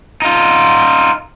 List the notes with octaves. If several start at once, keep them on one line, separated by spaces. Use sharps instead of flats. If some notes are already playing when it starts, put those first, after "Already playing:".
D#4 F4